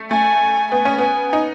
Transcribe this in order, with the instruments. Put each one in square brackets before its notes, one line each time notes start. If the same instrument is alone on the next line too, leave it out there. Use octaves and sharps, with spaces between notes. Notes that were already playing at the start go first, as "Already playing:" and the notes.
Already playing: [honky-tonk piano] A3
[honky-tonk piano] A3 [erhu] G#5
[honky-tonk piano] B3 [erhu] G#5
[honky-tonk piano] C#4
[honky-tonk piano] B3 [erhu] G#5
[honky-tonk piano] D#4